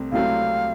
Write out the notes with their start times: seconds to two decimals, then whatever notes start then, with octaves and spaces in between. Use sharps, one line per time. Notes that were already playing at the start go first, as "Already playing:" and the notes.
Already playing: C2 C3 A3 C4
0.12 C2 C3 F#3 A3 C4 F5